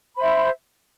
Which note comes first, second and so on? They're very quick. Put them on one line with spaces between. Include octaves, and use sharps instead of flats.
B5 C5 E5